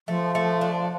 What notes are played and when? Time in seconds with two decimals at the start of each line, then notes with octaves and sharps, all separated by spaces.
0.08 F3 A3
0.35 A3
0.61 D4